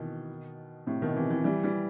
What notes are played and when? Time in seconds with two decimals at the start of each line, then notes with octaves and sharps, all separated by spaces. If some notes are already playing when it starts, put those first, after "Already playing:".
Already playing: B2 D#3 E3
0.86 A2 C3
1.02 B2 D#3
1.15 C3 E3
1.30 C3 E3
1.44 E3 G3
1.63 E3 G3